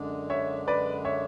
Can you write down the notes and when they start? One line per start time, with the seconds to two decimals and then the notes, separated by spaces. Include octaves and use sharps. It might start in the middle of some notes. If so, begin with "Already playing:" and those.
Already playing: F#2 D3 G#3 D4
0.30 C#5 E5
0.68 B4 D5
1.05 C#5 E5